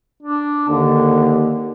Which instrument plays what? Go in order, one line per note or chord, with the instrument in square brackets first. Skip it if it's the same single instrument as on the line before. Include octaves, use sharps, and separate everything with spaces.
[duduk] D4
[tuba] D#2 [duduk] D3